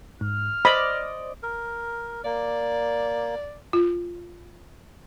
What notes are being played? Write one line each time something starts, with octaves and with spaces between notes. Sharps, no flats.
G#2 F6
C5 D5 D#5 B5
A#4
A#3 D5
F4